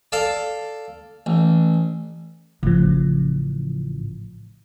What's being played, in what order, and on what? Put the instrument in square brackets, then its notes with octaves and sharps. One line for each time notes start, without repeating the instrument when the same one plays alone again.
[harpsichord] A4 D5 F5
A1
[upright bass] A1 [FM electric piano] C#3 F3